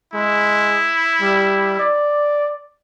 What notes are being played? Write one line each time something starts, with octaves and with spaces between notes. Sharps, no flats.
G#3 E4
G3
D5